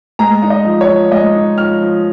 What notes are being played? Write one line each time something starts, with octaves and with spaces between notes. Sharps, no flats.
G#3 A#5
D#4
D#5
F3
C#5
F3
G#3 D#5
D#4
F3 F6
F3